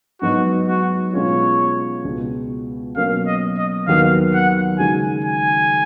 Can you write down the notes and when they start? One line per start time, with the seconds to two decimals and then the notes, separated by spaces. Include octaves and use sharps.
0.21 G#2 F#3 B3 D#4 F#4
0.68 F#4
1.13 B2 G#3 C#4 F4 C#5
2.05 C#2 B2 G#3
2.96 B2 F#3 A#3 C#4 F5
3.27 D#5
3.58 D#5
3.87 D#2 D#3 F#3 B3 F#4 F5
4.34 F#5
4.79 C#3 G#3 D#4 F#4 G#5
5.25 G#5